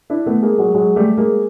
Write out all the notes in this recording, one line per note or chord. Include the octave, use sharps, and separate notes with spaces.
D4 E4
A3 B3
G#3 A#3
F#3 G#3
F#3 G#3
G3 A3
G#3 A#3